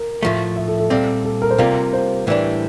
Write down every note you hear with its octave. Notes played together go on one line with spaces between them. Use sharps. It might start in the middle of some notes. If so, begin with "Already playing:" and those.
Already playing: A#4
A2 F3 A3
E5
A4
A4
A#2 G3 C4
A4
A#4
C5
C3 G3 A#3 F4 A#4
C5
A2 E3 G3 D4